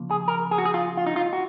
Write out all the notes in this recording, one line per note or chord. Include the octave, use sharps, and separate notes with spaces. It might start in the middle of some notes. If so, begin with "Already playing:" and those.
Already playing: C#3 F3 A#3
G#4
A#4
G#4
F#4
G#4
F4
F4
D#4
F4
F#4